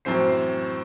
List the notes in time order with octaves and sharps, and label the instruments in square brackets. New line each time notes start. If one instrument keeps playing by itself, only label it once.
[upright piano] F#2 A2 E3 C4 C5 C7